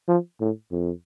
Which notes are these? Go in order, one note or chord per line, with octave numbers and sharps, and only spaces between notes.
F3
A2
F2